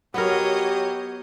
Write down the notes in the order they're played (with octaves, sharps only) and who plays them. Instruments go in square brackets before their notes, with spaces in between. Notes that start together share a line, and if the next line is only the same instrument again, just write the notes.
[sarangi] F#3 [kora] B3 A#4 [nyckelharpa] G4 [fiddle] C#5 D#5